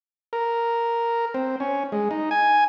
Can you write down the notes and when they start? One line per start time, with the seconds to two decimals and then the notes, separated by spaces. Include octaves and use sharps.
0.33 A#4
1.34 C4
1.60 C#4
1.92 G#3
2.11 D#4
2.31 G#5